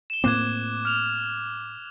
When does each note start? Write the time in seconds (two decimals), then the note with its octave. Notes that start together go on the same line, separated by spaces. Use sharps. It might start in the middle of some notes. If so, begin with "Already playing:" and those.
0.10 E7 G7
0.24 A2 A#3 C4 D6 F#6 G#6
0.85 F6 F7